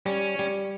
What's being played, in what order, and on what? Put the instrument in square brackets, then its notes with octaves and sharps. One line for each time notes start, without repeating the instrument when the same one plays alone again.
[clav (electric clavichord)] G3 [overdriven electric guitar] C#4
[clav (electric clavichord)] G3